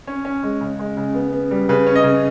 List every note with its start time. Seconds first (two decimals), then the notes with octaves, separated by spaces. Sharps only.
0.07 C#4
0.25 C#4
0.43 G#3
0.61 C#3
0.79 G#3
0.97 C#3
1.15 B3
1.33 B3
1.51 G3
1.69 C#3 B4
1.87 C#4
1.96 D#5
2.04 C#3